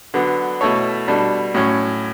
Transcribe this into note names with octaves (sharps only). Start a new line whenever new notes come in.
D3 F#3 B3
B2 A3 E4 A4 C#5
B2 G3 D4 A4
A2 F#3 C#4